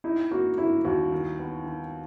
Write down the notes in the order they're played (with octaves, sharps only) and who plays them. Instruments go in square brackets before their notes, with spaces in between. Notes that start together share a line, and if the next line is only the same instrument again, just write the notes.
[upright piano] D#4 [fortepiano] E4
[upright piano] A#3 [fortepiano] F#4
[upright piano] A#3 [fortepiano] E4
[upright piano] D#2 [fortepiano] F#4
[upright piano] D#3
B3
D#3